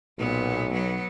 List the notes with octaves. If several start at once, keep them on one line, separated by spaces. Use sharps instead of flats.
B1 A#2 B3
F#3 B3